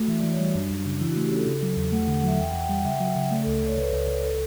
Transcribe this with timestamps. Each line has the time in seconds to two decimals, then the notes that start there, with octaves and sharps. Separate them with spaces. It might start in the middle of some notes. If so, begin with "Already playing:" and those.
Already playing: A3 F#4
0.08 E3 E5
0.19 E3 D5
0.32 C#5
0.39 G3 F#4
0.54 F#2 D4
0.70 F#2
0.86 C#3
1.00 E3 E4
1.12 A3 F#4
1.23 G4
1.32 C#4 A4
1.47 C#3
1.63 F#3
1.77 E2
1.92 A3 F#5
2.05 F#5
2.08 D3
2.16 F#5
2.23 F#3 E5
2.39 E2 G5
2.50 E2 F#5
2.62 G5
2.69 G3 F#5
2.85 C#3 E5
3.00 F#3
3.16 C#3
3.31 A3 D5
3.43 C#2 A4
3.58 D5
3.62 C#2 C#5
3.77 C#2 B4
3.93 C#2
4.07 C#2
4.23 A4